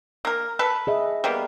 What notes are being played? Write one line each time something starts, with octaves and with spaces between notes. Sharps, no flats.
A#3 A#4
A4 B4
G#4 D#5 E5
G3 A#3 B3